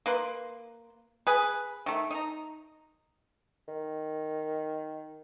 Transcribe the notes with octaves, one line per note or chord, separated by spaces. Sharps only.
A#3 B4 C6
G#4 B4
D#3 A3
D#4 A#5
D#3